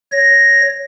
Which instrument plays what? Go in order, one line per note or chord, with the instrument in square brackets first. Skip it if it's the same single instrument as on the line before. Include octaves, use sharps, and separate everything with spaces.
[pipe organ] C#5 A#6